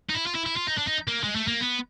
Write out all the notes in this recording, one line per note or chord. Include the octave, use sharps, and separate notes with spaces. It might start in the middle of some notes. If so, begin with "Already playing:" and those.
D#4
E4
F4
E4
E4
F4
D#4
D4
D#4
A#3
G#3
A3
A#3
B3